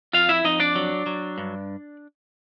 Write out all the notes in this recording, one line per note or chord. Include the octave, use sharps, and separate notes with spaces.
F2 F4 F5
E4 E5
F2 D#4 D#5
D4 D5
F#3
F#3
G2